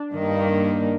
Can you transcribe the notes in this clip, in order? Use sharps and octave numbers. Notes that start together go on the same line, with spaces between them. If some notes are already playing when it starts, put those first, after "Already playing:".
Already playing: D4
G2 D#3 A#3